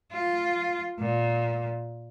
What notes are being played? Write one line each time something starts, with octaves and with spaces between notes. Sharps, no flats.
F4
A#2